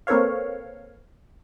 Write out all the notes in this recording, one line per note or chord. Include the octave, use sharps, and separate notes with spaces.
A#3 C4 A4 B4 C#5 F5